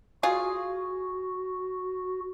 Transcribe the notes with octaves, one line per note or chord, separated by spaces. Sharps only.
F4 F#4 G#4